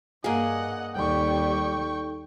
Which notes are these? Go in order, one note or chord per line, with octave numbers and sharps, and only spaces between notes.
G2 A#3 G#4 D#5 F#5
D#2 G3 D#4 A4 G5 C#6